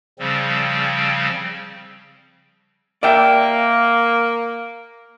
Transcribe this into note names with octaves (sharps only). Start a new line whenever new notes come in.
C#3 F3 G3 C4
A#3 D5 E5 G5